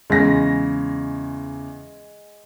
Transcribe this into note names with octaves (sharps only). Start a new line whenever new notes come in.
E2 C#3 G#3 A#6